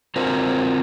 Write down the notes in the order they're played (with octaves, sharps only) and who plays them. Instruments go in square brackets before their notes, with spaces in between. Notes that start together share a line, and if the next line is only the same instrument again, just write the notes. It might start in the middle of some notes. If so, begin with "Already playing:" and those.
[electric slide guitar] C4 F4 F#4 A#4 C5